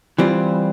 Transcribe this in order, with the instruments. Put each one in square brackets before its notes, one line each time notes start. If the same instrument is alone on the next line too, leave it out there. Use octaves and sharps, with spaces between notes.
[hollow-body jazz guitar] E3 G3 C4 F4